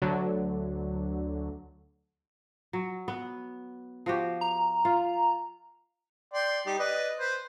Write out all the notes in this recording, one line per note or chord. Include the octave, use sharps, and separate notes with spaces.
D2 D3 F#3
F#3
B3
F3 F#4 G4
A#5
F4
D5 G5 C6
G3 D#4 G4
B4 D5 D#5
B4 C5